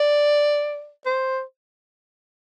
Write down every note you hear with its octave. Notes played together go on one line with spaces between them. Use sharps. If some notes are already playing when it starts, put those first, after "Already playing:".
Already playing: D5
C5